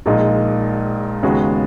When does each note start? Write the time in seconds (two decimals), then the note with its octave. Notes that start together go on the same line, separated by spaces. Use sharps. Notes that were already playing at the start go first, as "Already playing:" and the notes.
0.06 A#1 A#2 G#3 D#4
1.23 D#2 C#3 G#3 B3 F#4